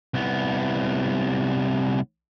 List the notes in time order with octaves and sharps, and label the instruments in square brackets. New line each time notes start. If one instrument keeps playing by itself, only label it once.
[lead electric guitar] C2 B3